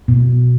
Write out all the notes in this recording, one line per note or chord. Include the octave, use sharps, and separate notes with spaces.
B2